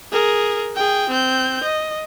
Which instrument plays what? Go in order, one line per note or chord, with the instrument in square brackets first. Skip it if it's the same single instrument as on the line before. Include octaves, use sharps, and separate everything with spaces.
[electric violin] G#4 A#4
G#4 G5
C4 G6
D#5